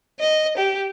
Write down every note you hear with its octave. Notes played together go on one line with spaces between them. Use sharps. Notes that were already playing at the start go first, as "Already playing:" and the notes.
D#5
G4